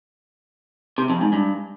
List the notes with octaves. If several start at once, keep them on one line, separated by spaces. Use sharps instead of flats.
C3
F2
G#2
G2